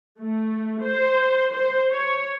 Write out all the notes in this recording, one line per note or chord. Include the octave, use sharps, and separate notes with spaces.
A3
C5
C5
C#5